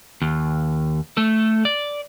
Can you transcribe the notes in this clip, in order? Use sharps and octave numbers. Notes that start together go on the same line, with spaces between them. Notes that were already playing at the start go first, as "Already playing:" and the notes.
D#2
A3 A4
D5